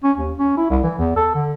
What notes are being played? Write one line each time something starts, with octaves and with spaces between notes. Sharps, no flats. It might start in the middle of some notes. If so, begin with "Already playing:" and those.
C#4
D#2
C#4
E4
C2
E3
E2
A4
D3